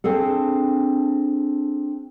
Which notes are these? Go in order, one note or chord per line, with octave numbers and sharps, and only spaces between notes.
C4 D4 G#4 A4